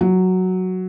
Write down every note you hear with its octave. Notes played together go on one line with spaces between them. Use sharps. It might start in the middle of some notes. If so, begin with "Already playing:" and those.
F#3